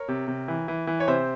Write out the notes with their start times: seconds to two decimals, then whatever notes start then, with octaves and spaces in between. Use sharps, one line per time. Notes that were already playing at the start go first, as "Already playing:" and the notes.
Already playing: A#4 C#5
0.08 C3
0.28 C3
0.48 E3
0.68 E3
0.87 E3
1.00 C#5
1.08 C3 C5 E5